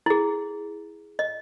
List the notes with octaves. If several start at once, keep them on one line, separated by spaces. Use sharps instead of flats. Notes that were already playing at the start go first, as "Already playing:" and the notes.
E4 G#4
D#5